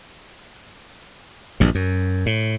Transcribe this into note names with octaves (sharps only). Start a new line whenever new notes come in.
A#1 G2
F#2
A2